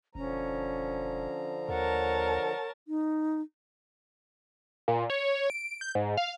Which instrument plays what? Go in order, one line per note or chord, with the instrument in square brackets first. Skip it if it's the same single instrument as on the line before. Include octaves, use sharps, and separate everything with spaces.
[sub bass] E1 [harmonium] D3 F3 A#5 [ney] C#4
[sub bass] D#2 [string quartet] A#4 C#5 A5 [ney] F#5
[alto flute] D#4
[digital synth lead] A#2
C#5
D7
G6
G#2
F5